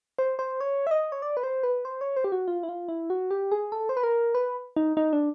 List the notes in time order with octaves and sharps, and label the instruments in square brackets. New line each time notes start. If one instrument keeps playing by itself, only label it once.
[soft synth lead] C5
C5
C#5
E5
D#5
C#5
D5
B4
C5
B4
C5
C#5
C5
G4
F#4
F4
E4
F4
E4
F#4
G4
G#4
A4
C5
B4
A#4
B4
D#4
D#4
D4